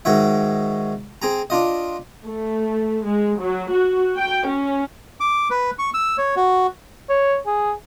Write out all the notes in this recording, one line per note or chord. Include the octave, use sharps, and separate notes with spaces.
G#2 D#3 F#4 C#5 E5
C4 G#4 A#5
D4 F4 D#5
A3
G#3
F#3
F#4
G5
C#4
D6
B4
C#6
E6
C#5
F#4
C#5
G#4